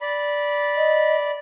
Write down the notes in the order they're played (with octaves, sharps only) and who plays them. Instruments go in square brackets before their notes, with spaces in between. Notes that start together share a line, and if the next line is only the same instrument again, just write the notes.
[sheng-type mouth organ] D5 B5
[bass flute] D#5